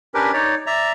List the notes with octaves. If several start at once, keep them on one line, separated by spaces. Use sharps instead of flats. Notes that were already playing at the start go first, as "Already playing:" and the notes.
C#4 D4 G4 A#4 B4
D#4 C#5 D5
D5 E5 A#5